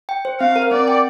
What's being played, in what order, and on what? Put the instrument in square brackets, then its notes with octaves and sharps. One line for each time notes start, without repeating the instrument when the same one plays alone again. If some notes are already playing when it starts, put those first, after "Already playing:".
[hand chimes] G5
C5
[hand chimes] C4 [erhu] F5
[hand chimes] A#4
[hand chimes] C4 [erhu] D5
[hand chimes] G5